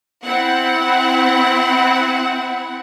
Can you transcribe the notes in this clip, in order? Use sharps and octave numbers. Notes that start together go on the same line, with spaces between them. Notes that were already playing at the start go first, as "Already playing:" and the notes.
C4 E4 F#5